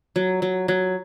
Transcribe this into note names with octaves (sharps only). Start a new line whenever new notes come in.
F#3
F#3
F#3